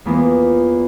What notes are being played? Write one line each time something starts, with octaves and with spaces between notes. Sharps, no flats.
E2 F3 A#3 B3